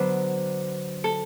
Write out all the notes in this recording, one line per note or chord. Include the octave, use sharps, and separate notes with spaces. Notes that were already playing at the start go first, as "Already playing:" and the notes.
Already playing: D3 F#3 B3 C5
A4